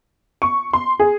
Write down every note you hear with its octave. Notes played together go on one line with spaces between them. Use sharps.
C#6
C6
G#4